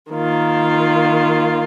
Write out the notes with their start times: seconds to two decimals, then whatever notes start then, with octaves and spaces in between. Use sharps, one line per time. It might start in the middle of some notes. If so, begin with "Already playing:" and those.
0.11 D#3 A#3 F4